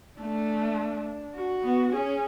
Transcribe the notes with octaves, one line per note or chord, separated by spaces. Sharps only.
A3 D4
F#4
B3
C#4 G#4